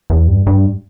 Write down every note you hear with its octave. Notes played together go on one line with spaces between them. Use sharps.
E2
G2
G2